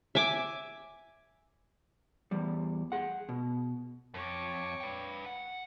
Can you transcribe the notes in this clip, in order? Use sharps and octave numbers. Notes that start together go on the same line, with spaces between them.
E5 G#5 D6
E2 G3
G#4 F#5
B2
F2 C#5 D6
B4 G5
F#5